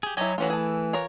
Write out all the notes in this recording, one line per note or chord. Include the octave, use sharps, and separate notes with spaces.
G4 G#4
F#3 E4 G4 C#5 D#5 G#5
E3 F#3 A3 C#4 E4 F4
G#4 A5
F4 A#4 C#5